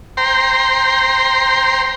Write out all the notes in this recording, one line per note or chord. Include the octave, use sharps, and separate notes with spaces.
C5 G5 A#5 C6